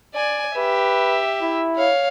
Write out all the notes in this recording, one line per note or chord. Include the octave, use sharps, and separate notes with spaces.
D5 G#5
G4 B4 E5
E4
C#5 F5